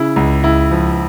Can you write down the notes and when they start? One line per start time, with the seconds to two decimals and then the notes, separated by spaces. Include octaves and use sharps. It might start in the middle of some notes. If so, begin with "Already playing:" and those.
Already playing: C#3 E4
0.16 C#2
0.44 C#2 E4
0.71 F3